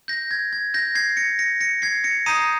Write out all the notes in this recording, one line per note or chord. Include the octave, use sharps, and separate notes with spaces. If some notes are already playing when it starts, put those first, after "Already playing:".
G6 A#6
G#6
G#6
G6 A#6
G#6 C7
A#6 C#7
A#6 C#7
A#6 C#7
G#6 C7
A#6 C#7
A#5 D#6 G6 C7 D#7